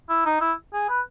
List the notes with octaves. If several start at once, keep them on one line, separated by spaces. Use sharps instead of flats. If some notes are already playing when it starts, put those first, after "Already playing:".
E4
D#4
E4
G#4
B4